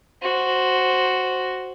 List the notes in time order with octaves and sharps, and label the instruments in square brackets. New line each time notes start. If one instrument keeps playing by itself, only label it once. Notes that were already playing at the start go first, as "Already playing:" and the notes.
[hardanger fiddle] F#4 C5